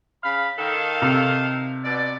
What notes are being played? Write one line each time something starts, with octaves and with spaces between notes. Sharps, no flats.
C#3 F5 B5
D#3 A4 F5
C3
B2 D5